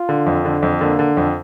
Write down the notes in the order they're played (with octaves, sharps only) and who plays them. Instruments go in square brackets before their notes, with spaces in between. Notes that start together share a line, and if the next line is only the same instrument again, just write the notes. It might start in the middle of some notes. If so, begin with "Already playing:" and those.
Already playing: [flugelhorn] F4
[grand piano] D3
F2
D3
F2
[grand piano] D3 [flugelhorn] A#3
[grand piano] D3
F2